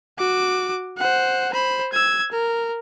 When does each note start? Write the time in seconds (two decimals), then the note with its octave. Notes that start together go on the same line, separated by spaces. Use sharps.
0.19 F#4 D6
0.98 C5 F#5
1.53 C5 B5
1.93 E6 G#6
2.32 A#4